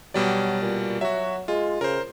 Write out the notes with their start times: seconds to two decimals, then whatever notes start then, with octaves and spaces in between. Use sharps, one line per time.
0.14 B2 F#3 G3 D5
0.62 A#2
1.01 F#3 F#4 E5
1.48 G#3 F4
1.81 C#3 A#4 C5